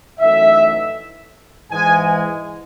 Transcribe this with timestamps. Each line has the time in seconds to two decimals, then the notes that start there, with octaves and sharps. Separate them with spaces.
0.20 F#2 E3 A3 D#4 E5
1.71 G#2 E3 G#3 G#5